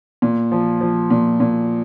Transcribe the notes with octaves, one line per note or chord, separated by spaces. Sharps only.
A#2
F3
F3
A#2
A#2